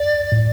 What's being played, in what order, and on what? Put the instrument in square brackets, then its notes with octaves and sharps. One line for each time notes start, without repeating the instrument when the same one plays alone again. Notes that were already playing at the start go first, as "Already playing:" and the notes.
Already playing: [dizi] D5
[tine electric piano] A2